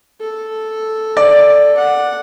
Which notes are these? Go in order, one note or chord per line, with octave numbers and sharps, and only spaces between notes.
A4
D5
F#5